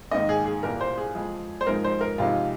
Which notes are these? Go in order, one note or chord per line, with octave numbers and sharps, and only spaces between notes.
G#2 D#3 A#3 D#4 D#5
G#4
G#4
C2 A#2 A#3 A#4
C5
G#4
F2 F3 G#3
C5
G#2 F3 G#3 A#4
C5
A#4
F2 C3 G#3 D#4 F4